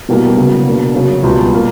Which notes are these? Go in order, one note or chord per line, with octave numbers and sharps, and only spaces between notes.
B2 G3 A#3 E4
C#3 F#3 B3
B2 A#3 D4
C#3 F#3 C#4
C#2 B2 G3
A#2 A#3